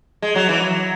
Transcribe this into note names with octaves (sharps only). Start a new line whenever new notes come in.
G#3
F#3
E3
F#3